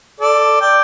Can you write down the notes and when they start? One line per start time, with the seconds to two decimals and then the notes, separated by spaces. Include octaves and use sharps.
0.20 A4 D5
0.61 D5 G5